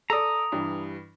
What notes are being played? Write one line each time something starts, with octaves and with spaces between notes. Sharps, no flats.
A4 D5 A#5 D#6
G2 E3 G3